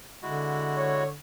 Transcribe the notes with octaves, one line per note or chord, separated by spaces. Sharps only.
D3 G#3 E4 F#4
C#5